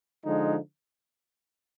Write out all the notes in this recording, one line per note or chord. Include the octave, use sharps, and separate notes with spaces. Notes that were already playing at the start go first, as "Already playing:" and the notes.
D3 F3 G#3 D#4